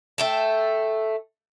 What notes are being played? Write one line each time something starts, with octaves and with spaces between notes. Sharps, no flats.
A3 G5 A5